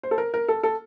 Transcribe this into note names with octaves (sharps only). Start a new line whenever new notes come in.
C5
A4
A#4
A#4
A4
A4